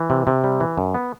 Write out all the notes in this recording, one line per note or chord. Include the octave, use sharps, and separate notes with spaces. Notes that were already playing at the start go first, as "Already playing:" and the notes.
Already playing: E3
C3
C3
G3
E3
F#2
B3